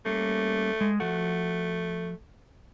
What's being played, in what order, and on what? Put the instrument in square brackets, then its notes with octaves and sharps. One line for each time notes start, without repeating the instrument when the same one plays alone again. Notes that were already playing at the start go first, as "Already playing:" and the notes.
[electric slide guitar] G3 A#3 C#4 [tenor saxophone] A3
[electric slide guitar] G#3
[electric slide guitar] F3 F#4 F#5 [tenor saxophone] A3